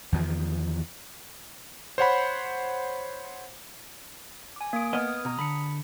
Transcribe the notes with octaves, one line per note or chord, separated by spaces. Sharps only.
E2 D#3 F3
C5 C#5 F#5 B5
G#5 D6
A#3 D#6 D7
B3 D#5 D#6 F6 G#6
B2 A#5 D#6
D3 B5 B6 C#7